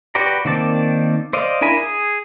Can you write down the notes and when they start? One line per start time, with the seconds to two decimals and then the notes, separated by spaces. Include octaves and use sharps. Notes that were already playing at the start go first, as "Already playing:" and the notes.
0.15 F#4 G4 B4 D5 A#5
0.45 D#3 A#3 C4 D5 A5
1.33 C5 D5 D#5 F5
1.61 D4 E4 A#4 G#5 B5
1.77 G#4